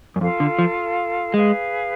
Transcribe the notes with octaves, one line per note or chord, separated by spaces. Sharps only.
F#2
F2 F4 A4 F5
D3
F3
G#3 G#4 B4 F5